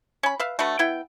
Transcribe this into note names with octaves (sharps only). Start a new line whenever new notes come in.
C#4 B5
B4 E5 F5
A3 D4 F#4 B4
B3 E4 G5